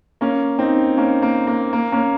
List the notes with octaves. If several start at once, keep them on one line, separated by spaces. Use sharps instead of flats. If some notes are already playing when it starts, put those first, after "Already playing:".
A#3 C#4
C4 D#4
A#3 C#4
A#3
A#3
A#3
A#3 C#4